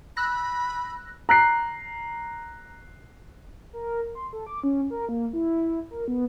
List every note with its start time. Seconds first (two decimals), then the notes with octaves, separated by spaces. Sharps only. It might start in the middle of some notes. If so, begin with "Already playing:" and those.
0.17 B5 E6 F#6 A#6
1.29 A#5 F#6 C7
3.73 A#4
4.15 C6
4.33 A4
4.47 D6
4.64 C#4
4.90 A#4
5.09 A#3
5.33 E4
5.91 A#4
6.08 B3